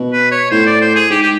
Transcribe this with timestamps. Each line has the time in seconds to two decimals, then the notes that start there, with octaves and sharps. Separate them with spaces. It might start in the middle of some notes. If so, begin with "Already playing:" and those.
Already playing: B2
0.12 B4
0.31 C#5
0.51 A2 C5
0.66 D5
0.81 C5
0.95 G#4
1.10 G#2 G4
1.23 G4